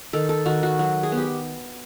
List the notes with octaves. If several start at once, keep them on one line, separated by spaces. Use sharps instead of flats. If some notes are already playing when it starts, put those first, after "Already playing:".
D#3 A4
A4
D#3 F#4
F#4
F#3
G#4
B3
G4